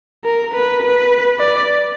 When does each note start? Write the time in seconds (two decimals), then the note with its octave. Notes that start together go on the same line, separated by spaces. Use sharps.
0.25 A#4
0.54 B4
0.83 B4
1.40 D5